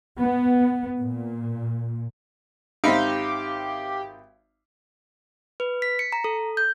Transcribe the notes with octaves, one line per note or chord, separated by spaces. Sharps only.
B3
A#2
G#1 C4 D#4 G4 E5 F5 B5
B4
B6
C#7
A#5
A4
G6